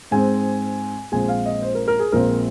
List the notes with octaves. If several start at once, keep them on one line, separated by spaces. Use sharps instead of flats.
G#2 G#3 C4 G#5
A#1 A#2 G#3 C4 G#5
F5
D#5
C5
A#4
A#4
G#4
A#1 A#2 G#3 C4 A#4